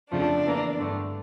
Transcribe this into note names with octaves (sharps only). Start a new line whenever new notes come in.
F2 C#3 F3 A3 D4
E2 E3 A#3
G2 D3 A3